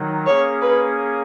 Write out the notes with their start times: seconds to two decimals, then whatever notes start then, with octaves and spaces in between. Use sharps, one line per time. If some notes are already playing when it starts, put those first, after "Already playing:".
Already playing: D#3 F#3 D#4
0.26 A#3 C#4 G#4 C#5
0.62 B4